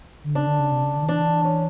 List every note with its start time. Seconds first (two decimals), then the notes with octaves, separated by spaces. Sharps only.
0.24 D3
0.35 C#3 D4
0.47 D3
0.59 C#3
0.72 C3
0.83 C#3
0.96 D3
1.03 D#3
1.08 E3 D4
1.44 C#4